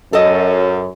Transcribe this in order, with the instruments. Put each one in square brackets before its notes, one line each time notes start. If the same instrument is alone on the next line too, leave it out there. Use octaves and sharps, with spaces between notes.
[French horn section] F#2 [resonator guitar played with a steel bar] A4 D#5